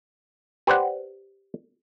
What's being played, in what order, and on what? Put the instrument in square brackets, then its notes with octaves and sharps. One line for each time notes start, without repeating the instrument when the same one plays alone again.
[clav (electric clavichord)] G4 B4 C5 D5 F#5